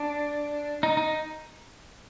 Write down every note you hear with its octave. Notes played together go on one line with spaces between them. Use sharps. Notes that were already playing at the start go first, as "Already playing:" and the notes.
Already playing: D4
D#4
D#4